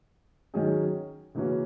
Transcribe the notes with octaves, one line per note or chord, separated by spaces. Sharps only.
D#3 F#3 C#4 G#4
C#3 E3 A#3 C#4 F#4